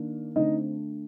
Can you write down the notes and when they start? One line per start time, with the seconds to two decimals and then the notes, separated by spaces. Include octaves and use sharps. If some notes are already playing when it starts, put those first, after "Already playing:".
Already playing: D#3 A#3 D4
0.36 D3 A3 C4 D#4 D#5